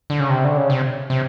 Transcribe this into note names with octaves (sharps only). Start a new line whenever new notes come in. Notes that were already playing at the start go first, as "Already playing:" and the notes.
D3
C#3
C3
D3
C#3
C3
C3